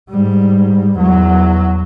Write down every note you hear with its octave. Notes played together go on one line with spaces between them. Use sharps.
G#2 G3
E2 F#3